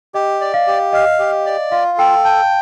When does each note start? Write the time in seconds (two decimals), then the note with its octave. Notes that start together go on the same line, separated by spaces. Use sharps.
0.14 G4 D#5
0.41 D5
0.54 F5
0.67 G4
0.93 D#5 F5
1.19 G4
1.46 D5
1.72 F4 F5
1.98 A4 G5
2.25 G5 A5